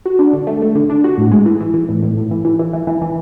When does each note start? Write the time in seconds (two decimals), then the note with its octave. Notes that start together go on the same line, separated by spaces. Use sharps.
0.06 F#4
0.19 D4
0.33 D3
0.47 A3
0.62 A3
0.75 D3
0.90 D4
1.04 F#4
1.18 A2
1.32 G#3
1.46 E3
1.60 E3
1.74 E3
1.89 A2
2.03 A2
2.17 A2
2.31 E3
2.45 E3
2.59 E3
2.73 E3
2.87 E3
3.02 E3